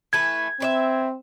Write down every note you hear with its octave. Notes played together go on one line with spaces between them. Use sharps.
E3 A3 B4 G#6
C4 B4 D5 E5